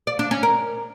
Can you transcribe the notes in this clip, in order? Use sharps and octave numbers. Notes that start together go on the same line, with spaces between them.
D5
D4
C#4
A#4